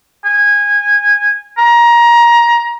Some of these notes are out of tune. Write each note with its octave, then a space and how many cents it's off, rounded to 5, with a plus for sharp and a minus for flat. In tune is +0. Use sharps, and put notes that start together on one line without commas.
G#5 -15
A#5 +20